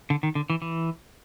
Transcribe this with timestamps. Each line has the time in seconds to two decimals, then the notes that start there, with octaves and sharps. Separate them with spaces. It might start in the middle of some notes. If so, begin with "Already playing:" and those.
0.10 D3
0.23 D#3
0.35 D3
0.50 E3
0.62 E3